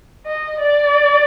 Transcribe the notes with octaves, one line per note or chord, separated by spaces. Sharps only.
D#5
D5